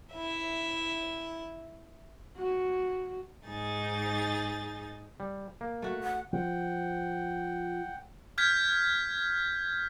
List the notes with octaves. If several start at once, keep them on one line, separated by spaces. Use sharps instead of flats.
E4 E5
F#4
G#2 D#4 G#4 A6
G3
A#3
A3 F#4
F#5
F3 F#5 G5
F6 G6 G#6 B6